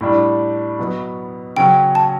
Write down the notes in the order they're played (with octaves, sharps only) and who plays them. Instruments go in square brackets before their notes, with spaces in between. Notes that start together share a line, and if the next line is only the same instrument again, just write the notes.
[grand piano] A2 G3 D4
B2 F#3 B3
[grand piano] C#3 F#3 C#4 [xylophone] G5
[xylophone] A5